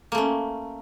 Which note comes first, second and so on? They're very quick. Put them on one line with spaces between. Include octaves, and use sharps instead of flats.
A#3 A3 C#4